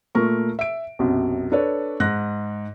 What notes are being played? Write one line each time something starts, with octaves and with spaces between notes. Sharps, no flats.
A#2 A3 A#4 C#6
E5 D7
B1 F#2 C3
D4 A4 B4 C#5 D5
G#2 F#6 A#6